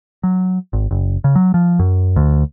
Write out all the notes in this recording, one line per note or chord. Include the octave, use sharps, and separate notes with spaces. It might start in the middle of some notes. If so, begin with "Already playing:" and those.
F#3
G#1
F#1
C#3
F#3
F3
F#2
D2